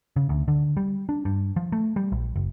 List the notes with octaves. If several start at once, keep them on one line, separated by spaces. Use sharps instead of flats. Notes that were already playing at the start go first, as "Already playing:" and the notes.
C#3
D2
D3
G3
D4
G2
F3
A3
G3
A#1
F#1